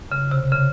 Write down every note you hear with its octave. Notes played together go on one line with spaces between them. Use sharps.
C#3
C3
C#3